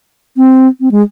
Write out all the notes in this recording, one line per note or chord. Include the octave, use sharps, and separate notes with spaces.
C4
C4
G#3